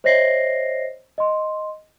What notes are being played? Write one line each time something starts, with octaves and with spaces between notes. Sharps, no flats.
C5 C#5 D#5 E5 A#6 C7
D#5 C6